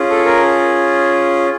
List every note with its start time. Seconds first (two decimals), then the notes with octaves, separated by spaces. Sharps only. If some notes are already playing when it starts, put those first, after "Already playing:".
Already playing: C#4 F4 G#4
0.10 A4
0.26 A#4